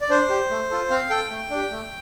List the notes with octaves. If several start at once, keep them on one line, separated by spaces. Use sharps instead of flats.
D5
D4 C5
G4
A3
F4 A4
C4 F5
A4 G5
A3
D4 G4
A3